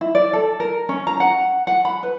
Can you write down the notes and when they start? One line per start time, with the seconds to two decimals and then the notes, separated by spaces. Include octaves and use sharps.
0.01 E4
0.15 D5
0.33 A4
0.60 A#4
0.89 C#4
1.07 A#5
1.20 F#5
1.67 F#5
1.85 B5
2.03 B4